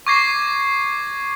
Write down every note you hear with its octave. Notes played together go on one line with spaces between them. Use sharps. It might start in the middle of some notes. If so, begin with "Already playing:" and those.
C#6 D6 G#6 A#6 C7